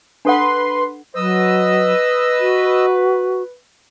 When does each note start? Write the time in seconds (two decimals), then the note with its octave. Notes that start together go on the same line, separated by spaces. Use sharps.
0.25 D4 A4 B4 F#5 C6
1.16 F#3 B4 D#5 E6
2.40 F#4